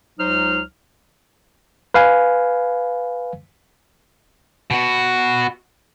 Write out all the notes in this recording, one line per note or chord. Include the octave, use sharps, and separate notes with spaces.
C#2 F#3 D#4 C5 F6
B4 F5 G#5
B2 F#4